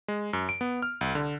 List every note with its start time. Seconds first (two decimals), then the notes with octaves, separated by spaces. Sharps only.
0.08 G#3
0.33 F#2
0.49 D7
0.61 B3
0.82 F6
1.01 C2
1.15 D3